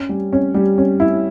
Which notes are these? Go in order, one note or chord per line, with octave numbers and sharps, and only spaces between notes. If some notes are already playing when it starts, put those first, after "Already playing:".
Already playing: C#4
G3
C#4
G3
C#4
E4